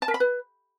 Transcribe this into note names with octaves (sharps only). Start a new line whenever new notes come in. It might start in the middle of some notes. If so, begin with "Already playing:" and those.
A5
A#4
B5
B4